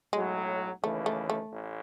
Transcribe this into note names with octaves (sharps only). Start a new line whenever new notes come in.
B1 A2 F#3 G#3
D#2 C#3 E3 A3
A3
A3
A1